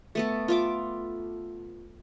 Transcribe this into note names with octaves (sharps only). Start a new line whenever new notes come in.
A3 B3 A4
F4 E5 D6